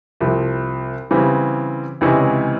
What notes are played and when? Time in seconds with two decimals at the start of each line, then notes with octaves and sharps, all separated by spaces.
0.21 C2 C3 F3
1.11 C#3 E3 G3 C4
2.01 C#2 C3 E3 G#3 C#4